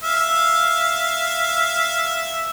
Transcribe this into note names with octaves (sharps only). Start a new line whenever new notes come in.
E5 F5